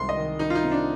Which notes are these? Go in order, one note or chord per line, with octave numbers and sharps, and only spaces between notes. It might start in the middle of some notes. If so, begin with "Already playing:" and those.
Already playing: C2 D#3 G#3 C6
D#5
D#3
D#3 D#4
F4
D#4
C3
D4